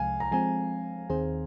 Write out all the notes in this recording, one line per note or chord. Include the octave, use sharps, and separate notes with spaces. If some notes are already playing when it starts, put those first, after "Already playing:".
Already playing: C2 C3 F3 G#3 F5 G#5
A#5
F3 G#3 C4 G#5
D#2 D#3 C4 G#4 C5